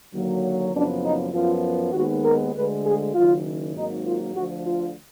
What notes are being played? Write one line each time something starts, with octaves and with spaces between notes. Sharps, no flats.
D#2 D3 F#3 A#3
F#1 F#2 F3 B3 D4
D#4
F#2 F3 B3 F4
D#2 D#3 G#3 B3 F#4
A#4
D2 D3 G#3 B4
G#4
F#1 F#2 D#3 F4
G#1 G#2 F#3 A#3 D#4
F4
D2 D3 F3 F#4
F4